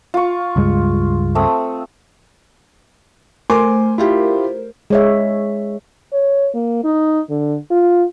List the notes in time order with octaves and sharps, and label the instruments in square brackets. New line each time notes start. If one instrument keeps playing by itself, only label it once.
[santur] F4 C#6
[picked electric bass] C#2 G2 G#3
[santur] A3 C4 D#6
[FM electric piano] A3 A#4 C5 [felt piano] G#5 C6 D6
[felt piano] E4 F4 G4
[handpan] G#3 C#5 E5
[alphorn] C#5
A#3
D#4
D3
F4